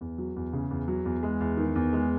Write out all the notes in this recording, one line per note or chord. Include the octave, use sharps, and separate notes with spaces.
E2
F#3
E2
C#3
E2
F#3
E2
G#3
E2
D#3
E2
G#3